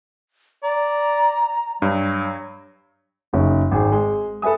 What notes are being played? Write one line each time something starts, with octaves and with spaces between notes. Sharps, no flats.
D5 A#5
G2 F#3
F#1 C#4 D#4
G#1 G#2 G#4
G#3
A4 B4 E5 G#5 D#6